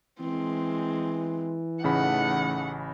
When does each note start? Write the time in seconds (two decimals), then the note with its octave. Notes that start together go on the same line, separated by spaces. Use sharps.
0.20 E3 G#3 C4
1.84 A1 C#3 A3 D#4 F#5 B5